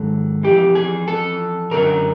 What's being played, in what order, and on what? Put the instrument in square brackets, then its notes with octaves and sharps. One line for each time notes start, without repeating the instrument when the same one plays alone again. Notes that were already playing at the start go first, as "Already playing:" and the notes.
Already playing: [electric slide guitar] G#2 D#3 F#3 A4
F2 C3 E3 G4
G#4
A4
F#2 D3 F#3 A#4